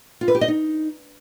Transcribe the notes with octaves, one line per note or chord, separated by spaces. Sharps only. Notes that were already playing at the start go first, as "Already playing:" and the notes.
F4
B4
G4
D#5
D#4